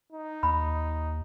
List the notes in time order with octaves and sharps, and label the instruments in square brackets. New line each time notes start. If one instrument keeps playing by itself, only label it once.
[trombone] D#4
[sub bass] D#2 [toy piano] B5